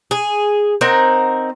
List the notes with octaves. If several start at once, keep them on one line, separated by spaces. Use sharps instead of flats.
G#4
C4 D#4 A#4 F#5